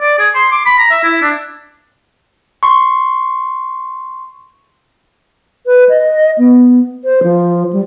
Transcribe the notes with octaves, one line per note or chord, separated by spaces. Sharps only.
D5
G#4
C6
D6
B5
A#5
E5
E4
D4
C6 C#6
B4
D#5
B3
C5
F3
G3